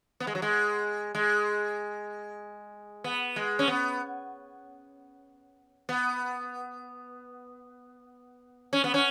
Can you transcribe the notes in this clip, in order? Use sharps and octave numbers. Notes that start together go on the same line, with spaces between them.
B3
G#3
F#3
G#3
G#3
B3
G#3
C#4
B3
B3
C#4
B3
C#4